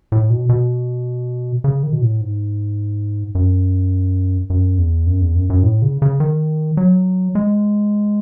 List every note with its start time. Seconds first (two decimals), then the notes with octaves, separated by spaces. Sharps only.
0.12 A2
0.30 B2
0.49 B2
1.64 C#3
1.83 D#3
1.93 B2
2.01 A2
2.21 G#2
3.35 F#2
4.50 F#2
4.78 E2
5.07 F#2
5.21 E2
5.35 F#2
5.50 F#2
5.63 A2
5.82 C#3
6.02 C#3
6.20 D#3
6.77 F#3
7.35 G#3